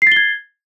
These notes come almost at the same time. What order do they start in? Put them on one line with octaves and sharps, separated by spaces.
C7 A6 G7 G#6